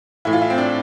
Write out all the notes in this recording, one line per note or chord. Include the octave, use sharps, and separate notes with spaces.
A2 E3 E4
F4
E4
C4
D4